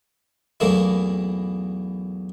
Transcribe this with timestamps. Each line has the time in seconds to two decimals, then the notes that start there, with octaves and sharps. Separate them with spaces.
0.60 B1 E2 A3 A#3 E4